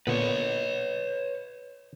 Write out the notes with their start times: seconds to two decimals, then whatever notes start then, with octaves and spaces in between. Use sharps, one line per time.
0.07 A#2 D3 B3 B4 C#5